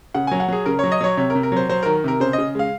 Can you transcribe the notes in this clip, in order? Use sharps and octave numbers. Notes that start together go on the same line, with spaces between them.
C#3 F#5
F#3 G#5
F#5
F#3 G#4
C#3 A#4
F#3 C#5
D#5
F#3 C#5
C3 C#5
A#4
C3
A#4
F#3 C5
F#3 C5
D#3 A#4
C3 A#4
C#3 C5
D#5
C#3
G#3 F5